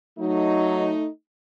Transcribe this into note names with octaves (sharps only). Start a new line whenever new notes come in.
F#3 A3 D#4